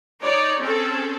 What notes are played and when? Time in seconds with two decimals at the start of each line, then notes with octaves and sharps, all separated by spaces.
0.23 D#4 C#5 D5
0.61 C4 C#4 G#4 A4